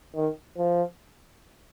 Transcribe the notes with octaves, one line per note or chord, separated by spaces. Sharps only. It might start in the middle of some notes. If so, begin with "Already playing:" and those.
D#3
F3